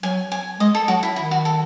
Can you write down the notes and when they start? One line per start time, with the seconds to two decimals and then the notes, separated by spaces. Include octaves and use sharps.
0.03 F#3 G#5
0.32 G#5
0.60 G#3 D#5
0.75 A4
0.88 F#3 F#4
1.03 E4
1.16 D#3 E4
1.31 F#4
1.45 A4